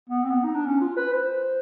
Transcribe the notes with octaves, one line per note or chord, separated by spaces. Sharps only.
B3
C4
B3
D#4
D4
C#4
F4
B4
C5